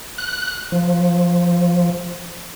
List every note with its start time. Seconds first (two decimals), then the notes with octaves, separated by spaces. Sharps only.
0.18 F#6
0.72 F3